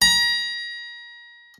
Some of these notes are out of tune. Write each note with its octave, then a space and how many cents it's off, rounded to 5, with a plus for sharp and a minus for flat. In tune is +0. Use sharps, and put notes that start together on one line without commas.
A#5 +30